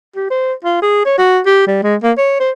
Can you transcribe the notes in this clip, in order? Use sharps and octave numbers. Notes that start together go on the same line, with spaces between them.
G4
C5
F4
G#4
C#5
F#4
G4
G3
G#3
A#3
C#5
C5